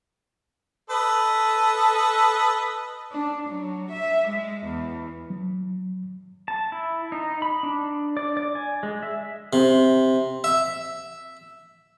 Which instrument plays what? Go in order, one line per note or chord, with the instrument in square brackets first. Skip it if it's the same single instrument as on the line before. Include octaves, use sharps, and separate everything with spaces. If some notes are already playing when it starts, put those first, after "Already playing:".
[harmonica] A4 B4 D#5
[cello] D4
F#3
E5
G#3
E2
[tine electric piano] F#3
[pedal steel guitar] A5
E4
D#4
B5
D4
D5
D5
G#5
G#3
E5
[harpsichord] C3
E5